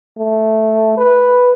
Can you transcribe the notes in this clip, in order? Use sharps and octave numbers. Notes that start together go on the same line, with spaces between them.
A3
B4